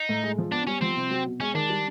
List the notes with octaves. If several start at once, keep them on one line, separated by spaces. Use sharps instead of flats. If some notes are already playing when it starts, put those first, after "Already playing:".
Already playing: D#4
A2
G#3
F3
B3 D4
G3 C#4
F3 C4
C3
F#3
B2
G#3 C#4
D#3 D4
G3